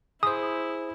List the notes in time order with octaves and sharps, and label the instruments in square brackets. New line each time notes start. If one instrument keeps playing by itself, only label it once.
[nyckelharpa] E4 [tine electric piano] G#4 C5 [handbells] D#6